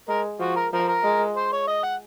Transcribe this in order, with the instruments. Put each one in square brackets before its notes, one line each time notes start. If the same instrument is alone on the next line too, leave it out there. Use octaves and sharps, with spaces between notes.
[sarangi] G#3 [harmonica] A#4
[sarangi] F3 [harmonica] F#4
[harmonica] A#4
[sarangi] F3 [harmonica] A#4
[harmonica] A#4
[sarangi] G#3
[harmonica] C5
C#5
D#5
F#5